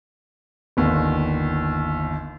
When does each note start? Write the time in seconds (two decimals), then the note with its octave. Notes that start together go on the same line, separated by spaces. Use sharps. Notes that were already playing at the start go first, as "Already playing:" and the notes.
0.77 G1 D#2